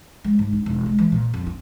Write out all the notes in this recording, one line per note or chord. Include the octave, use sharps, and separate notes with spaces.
G#3
G#2
D#4
E1
G#3
E3
A#2
F2
F4